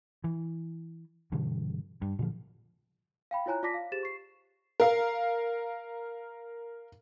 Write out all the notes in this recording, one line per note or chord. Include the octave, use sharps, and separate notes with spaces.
E3
G2 B2 D3 E3
G2
A#2 D3 F3
F5 G5 B5
E4 F4 C#5 G#5 A#5 F#6
F4 D5 A5 D6 A#6 B6
F5
G4 G#4 C5 A6 E7
C#6 C7
A#4 F5